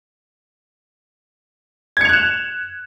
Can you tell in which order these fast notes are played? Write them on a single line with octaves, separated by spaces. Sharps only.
G#6 C#7 F7 F#6 E7